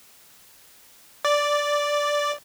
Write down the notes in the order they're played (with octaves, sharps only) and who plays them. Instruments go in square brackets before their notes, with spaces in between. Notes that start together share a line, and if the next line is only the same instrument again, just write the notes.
[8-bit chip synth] D5